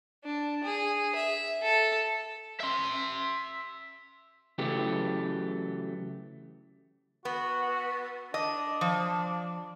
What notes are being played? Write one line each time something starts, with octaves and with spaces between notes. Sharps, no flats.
D4
G#4
E5
A4
E5 C6
C#3 E3 F#3 A3 G4
B3 F#4
D4 D#5
F3